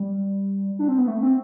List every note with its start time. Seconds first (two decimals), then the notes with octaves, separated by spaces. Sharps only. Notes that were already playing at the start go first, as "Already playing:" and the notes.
Already playing: G3
0.79 D4
0.88 C4
0.98 B3
1.08 A3
1.22 C4